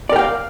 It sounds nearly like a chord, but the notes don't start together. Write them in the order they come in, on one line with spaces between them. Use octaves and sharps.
D5 A#4 G5 F5